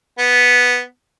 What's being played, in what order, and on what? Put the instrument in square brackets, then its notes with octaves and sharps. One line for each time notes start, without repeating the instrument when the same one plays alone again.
[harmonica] B3